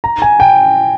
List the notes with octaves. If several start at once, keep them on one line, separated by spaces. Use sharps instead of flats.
A#5
G#5
G5